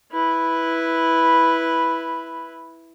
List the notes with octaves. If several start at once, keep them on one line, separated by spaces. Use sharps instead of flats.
E4 B4